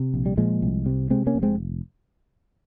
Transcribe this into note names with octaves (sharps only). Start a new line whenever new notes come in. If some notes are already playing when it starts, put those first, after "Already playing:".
Already playing: C3
A#1
G3
A#2 F3 G#3
C2
C3
C3 G#3 C4
A#3 C#4
F1
G#3 C4